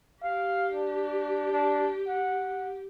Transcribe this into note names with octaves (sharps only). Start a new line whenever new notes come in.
G4 F5
D4
D4
F#5